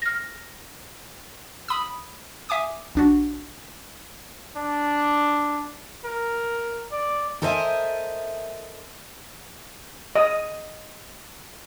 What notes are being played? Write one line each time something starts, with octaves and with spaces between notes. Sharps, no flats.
F6 A#6
B5 D#6 E6
E5 G#5 D6 D#6
A#1 D4 F#4
D4
A#4
D5
A4 A#4 C5 D#5 E5 G#5
D#5 D#6